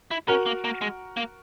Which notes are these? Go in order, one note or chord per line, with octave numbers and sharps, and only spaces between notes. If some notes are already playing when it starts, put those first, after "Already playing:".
E4
C#4 F#4 A#4
A#3
A#3
G#3
A#3